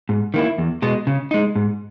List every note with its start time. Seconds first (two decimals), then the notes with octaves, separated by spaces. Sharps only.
0.09 G#2
0.34 D#3 A#3 E4
0.58 E2
0.82 B2 G#3 B3
1.07 C#3
1.31 G#3 D#4
1.55 G#2